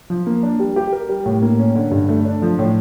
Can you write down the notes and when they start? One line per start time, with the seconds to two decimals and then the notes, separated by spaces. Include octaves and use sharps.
0.10 F3
0.27 A#3
0.43 D4
0.60 G3
0.76 G4
0.92 A#4
1.09 G3
1.26 A2
1.42 A#3
1.59 C#4
1.75 D3
1.91 G2
2.09 A3
2.25 D4
2.42 F3
2.59 A2